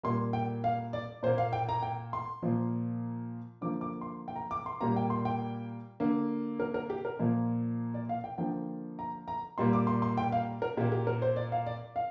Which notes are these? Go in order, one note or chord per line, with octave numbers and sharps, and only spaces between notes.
A#2 G3 A#3 C6
G5
F5
D5
A#2 A#3 C5
F5
G5
A#5
G5
C6
A#2 F3 A#3
D3 F3 A#3 D6
D6
C6
G5
A#5
D6
C6
A#2 G3 A#3 A#5
G5
C6
G5
D3 A#3
A#4
A#4
G4
A#4
A#2 F3 A#3
D5
F5
G5
D3 F3 A#3 G5
A#5
A#5
A#2 G3 A#3 C6
D6
C6
C6
G5
F5
A#4
A#2 A#3 G4
G4
A#4
C5
D5
F5
D5
F5